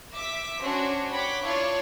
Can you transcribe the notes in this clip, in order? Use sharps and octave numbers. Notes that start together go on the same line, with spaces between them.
E5 D6 B6
C#4 D4 F#4 C5 C#5
C#5 F#5 G5 B5 D6
D4 E4 F4 C#5 D5